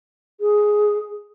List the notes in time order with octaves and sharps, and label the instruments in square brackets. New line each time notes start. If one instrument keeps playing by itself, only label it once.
[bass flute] G#4